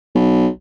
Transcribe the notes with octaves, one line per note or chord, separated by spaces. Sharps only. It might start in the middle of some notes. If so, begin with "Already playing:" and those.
B1